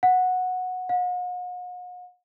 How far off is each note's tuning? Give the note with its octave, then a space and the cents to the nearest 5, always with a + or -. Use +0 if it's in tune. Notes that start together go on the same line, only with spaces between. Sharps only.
F#5 -10
F#5 -45